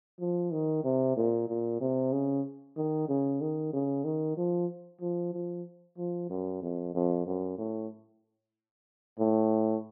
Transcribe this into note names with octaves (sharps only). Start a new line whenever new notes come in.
F3
D#3
C3
A#2
A#2
C3
C#3
D#3
C#3
D#3
C#3
D#3
F3
F3
F3
F3
F#2
F2
F2
F#2
A2
A2